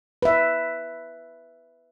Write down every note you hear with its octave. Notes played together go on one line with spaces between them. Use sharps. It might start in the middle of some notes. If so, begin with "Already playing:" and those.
B4 E5